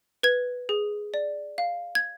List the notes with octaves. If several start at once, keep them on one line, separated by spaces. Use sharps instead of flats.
B4 G#6
G#4
D5
F5
G#6